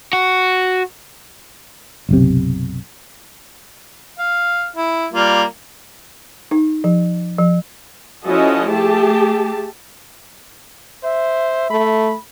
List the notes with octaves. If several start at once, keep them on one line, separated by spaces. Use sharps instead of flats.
F#4
F#1 B1 C3
F5
E4
G3 A#3 F4
D#4
F3
F3
F3 C#4 E4 F#4 A4 D#5
A3 G4 G#4 A5
C5 E5
A3 B5